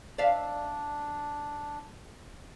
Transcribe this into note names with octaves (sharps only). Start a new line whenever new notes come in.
D4 D5 E5 F5